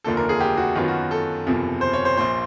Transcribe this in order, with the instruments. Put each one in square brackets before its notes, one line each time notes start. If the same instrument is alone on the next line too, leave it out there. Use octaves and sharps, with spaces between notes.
[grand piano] F1 D#2 D3 F3 A#3 A4
A#4
G#4
G4
F#4
F#2 D#3 F#3 B3 F4
F#4
A4
F#1 E2 C3 F3
C5
C#5
C5
A#1 A#2 F3 C5